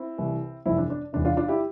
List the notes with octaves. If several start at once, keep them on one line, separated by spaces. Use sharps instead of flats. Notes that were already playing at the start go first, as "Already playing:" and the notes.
Already playing: C4 E4
C2 C3 E3
G1 F2 C3 E3 C4 E4
D4
D4
E1 E2 C3 D4
D4 F4
D4 F4
E4 G4